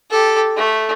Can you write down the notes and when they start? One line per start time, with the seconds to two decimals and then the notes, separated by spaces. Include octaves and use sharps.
0.10 G4 A4
0.56 A3